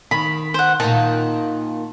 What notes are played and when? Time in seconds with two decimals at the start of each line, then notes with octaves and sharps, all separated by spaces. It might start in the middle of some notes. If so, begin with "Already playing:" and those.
0.11 D#3 B5
0.54 C5 F#5
0.80 A#2 D#3 A5